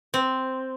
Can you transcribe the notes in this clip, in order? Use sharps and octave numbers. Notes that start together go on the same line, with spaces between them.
C4